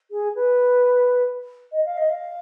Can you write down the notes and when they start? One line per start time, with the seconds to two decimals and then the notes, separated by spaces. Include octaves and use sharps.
0.11 G#4
0.35 B4
1.72 D#5
1.86 F5
1.98 D#5
2.10 F5